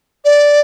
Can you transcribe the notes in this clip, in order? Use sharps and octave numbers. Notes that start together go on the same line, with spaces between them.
D5